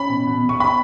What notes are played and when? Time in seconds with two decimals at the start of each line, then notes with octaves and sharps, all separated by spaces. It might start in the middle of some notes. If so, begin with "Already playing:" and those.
Already playing: C#4 B5
0.09 B2
0.27 B2
0.42 B2
0.49 C#6
0.60 B5